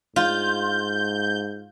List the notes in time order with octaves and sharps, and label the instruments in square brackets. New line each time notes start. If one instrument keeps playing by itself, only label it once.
[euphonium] G#2 [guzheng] F4 [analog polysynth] G6